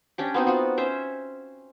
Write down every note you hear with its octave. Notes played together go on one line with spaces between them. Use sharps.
C#4 D4 G4
B3 C4 D#4 F#4
F4 F#4
C#4 C5 E5